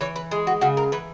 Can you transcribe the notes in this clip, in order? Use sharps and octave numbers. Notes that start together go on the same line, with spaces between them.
E3 C#5
B4
G#3 G#4
F#4
C#3 F#4
A#4
E3 B4